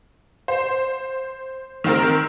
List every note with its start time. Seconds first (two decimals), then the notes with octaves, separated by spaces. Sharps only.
0.48 C5
1.84 D#3 C4 A#4